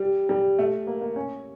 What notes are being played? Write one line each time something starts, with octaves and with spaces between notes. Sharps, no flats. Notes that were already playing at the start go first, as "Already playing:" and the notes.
Already playing: G3
G3
A3
A#3
A#3
C#4